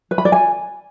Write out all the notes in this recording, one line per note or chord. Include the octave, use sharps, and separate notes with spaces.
B4
B5
D5
G#5